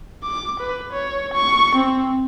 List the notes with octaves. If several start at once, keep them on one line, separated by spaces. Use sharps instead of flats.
D6
B4
C#5
C#6
C4